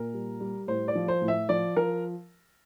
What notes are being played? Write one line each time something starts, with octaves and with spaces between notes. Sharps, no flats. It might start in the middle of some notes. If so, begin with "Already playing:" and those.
Already playing: A#2 A#4
G3
G3
A2 C5
D5
F3
C5
A2
E5
F3 D5
F3 A#4